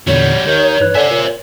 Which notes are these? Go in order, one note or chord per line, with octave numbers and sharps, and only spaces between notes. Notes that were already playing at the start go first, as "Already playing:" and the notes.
E2 A#2 D3 G3 F#4 C#5
D#2 D#3 G6
G2 B4 F#6
D3 C5 E5 G#5
A#2